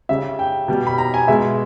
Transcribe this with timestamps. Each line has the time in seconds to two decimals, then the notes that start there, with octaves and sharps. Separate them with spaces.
0.09 C#3 G3 E5
0.39 G5
0.68 B2 G3
0.87 B5
0.98 A#5
1.14 G#5
1.28 B2 G#3 E5